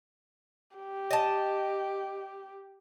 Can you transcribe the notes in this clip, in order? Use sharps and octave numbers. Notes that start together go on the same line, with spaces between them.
G4
D#5 A5